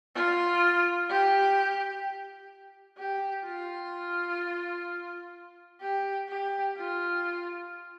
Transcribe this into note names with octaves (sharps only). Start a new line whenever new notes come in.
F4
G4
G4
F4
G4
G4
F4